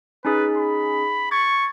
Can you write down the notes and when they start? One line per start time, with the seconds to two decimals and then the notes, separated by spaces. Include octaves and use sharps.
0.25 C#4 D#4 G#4 B4
0.57 B5
1.31 C#6 G#6 A6